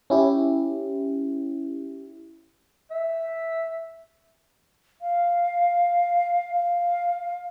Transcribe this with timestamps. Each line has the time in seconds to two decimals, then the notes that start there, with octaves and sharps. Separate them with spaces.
0.10 C#4 E4 G4
2.91 E5
5.01 F5
6.54 F5